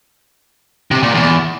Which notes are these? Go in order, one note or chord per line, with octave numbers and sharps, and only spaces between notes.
C3
A#2
E2